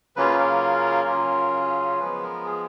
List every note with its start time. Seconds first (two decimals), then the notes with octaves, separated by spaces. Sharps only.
0.16 C#3 F#3 A#3 C#4 F4 B4
0.39 A#4
1.08 C#3 F#3 C#4 F4
2.00 F3 G#3 B3 B4
2.23 A#4
2.46 G#4